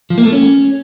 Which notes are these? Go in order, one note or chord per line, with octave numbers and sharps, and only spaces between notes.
F3
A#3
A3
C#4